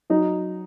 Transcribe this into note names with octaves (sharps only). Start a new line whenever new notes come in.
F#3 D#4